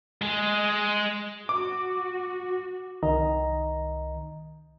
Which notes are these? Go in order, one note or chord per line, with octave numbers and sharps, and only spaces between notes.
G#3 G#4
F#4 D6
C2 D#3 D#5 A#5